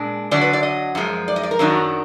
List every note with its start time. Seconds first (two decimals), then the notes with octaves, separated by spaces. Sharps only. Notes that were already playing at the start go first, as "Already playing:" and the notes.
Already playing: A#2 G#3 D4
0.31 D3 F#3 D4 D5
0.41 B4
0.53 D5
0.63 D#5
0.95 F#2 F3 G#3
1.28 D5
1.36 D#5
1.43 D5
1.51 A#4
1.59 F#2 D#3 F#3 D4